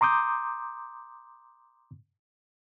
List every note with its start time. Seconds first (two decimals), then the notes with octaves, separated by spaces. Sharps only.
0.01 A#5 C6 D6 D#6 G6